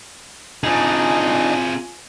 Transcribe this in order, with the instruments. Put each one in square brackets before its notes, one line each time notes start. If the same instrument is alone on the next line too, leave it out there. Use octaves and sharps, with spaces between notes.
[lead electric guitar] C4 G#4 [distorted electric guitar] D4 D#4 [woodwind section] F4 G#5